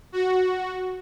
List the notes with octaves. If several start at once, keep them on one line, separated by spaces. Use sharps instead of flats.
F#4